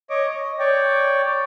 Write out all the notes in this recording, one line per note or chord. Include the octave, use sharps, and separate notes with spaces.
C#5 D#5 D6
D#5
C#5 D5 G5